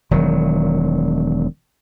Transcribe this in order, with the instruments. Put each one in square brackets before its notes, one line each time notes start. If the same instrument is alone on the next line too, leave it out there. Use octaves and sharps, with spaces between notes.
[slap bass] E1 D#3 F#3